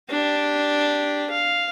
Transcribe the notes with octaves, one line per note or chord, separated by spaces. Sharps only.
D4 G4
F5